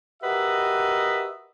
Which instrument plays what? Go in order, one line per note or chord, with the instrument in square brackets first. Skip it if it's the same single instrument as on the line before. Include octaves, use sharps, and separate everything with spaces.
[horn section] F#4 G4 A#4 B4 D#5 E5